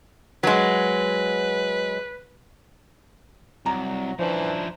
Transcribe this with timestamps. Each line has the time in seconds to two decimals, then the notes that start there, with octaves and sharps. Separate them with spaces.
0.43 F#3 G#3 B4
3.66 C2 F#3 A#5
4.19 E3 F3 C#4 D4 E4 C5